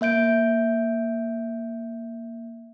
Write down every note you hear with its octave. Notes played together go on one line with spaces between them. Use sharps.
A#3 E5 G6 D7